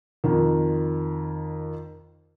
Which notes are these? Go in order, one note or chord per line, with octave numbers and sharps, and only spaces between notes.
F2 D#3